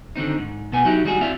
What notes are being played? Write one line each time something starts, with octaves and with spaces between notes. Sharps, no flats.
D3 D#3 C4 D#4
G#2
B2 B3 G#5
F#3 D#4 E4 G4
D#3 G3 G#3 B3 F#4 G#4
C4 E4 D5 E5 F5